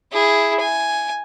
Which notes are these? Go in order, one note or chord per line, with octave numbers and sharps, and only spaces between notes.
E4 G#4
G#5